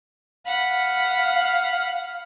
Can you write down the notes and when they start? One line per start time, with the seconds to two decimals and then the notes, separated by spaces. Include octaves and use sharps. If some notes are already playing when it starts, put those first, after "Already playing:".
0.47 F5 F#5 B5